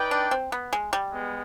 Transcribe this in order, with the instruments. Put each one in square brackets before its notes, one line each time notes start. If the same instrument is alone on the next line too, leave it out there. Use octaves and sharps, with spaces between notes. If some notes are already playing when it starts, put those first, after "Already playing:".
Already playing: [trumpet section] D#4 B4 D5 G5
[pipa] D4
C4
B3
G#3
G3
[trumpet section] G#3 B3